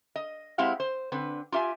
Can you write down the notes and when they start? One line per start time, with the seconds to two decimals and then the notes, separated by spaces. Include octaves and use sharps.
0.16 D#5
0.58 G#3 C4 E4 G4 F5 F#5
0.80 C5
1.12 D3 C4 B4
1.52 F4 G4 E5 G#5